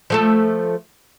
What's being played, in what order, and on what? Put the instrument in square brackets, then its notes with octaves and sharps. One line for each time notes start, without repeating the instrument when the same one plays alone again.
[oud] F3 A3 A4